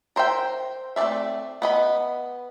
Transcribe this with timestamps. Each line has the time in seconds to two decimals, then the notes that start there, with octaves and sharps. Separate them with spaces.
0.16 A#4 C5 E5 G5
0.96 A3 C4 A4 D5 E5
1.62 B3 D#5 B5